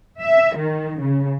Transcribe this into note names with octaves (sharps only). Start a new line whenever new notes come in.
E5
D#3
C#3